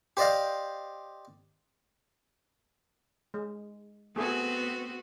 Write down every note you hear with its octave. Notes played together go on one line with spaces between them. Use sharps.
G4 C5 D5 D#5 F5
G#3
A3 B3 C4 F#4 G#4 A4